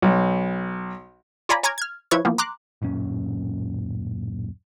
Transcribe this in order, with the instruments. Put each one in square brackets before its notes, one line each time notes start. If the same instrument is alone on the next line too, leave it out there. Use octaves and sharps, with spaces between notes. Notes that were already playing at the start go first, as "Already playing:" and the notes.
[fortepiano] B1
[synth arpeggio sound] F4 C#5 D5 G#5 A#5 B5
C#5 G#5 A#5 D6 F6 G#6
F6 G#6
F3 E4 B4 C#5 C#6 G#6
E3 F3 A#3 B3
A#5 C6 D6 F#6
[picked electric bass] D1 F#2 A#2 C#4